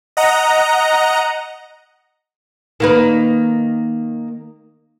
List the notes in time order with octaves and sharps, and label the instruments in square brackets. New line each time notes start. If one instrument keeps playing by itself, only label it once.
[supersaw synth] D#5 F#5 A#5
[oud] D#3 A#3 B4